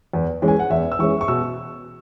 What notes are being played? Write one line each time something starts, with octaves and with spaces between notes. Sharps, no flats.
E2
E3 G#3 C#4
G#5
F#5
E2 E5
E6
E3 G#3 C#4 C#6
C#6
B2 E6